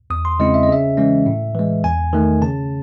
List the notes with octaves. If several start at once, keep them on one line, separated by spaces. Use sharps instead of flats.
E2 D#6
C6
C#3 G#3 C4 E4 D#5
E5
D#5
C#3 E5
E3 G#3 C#4
A2
E3 G#3
E2 G#5
D#3 A3
C#3 A5